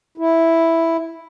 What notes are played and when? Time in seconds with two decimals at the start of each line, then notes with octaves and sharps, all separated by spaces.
0.18 E4